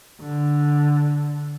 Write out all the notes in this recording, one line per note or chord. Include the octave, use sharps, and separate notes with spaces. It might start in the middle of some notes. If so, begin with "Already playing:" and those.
D3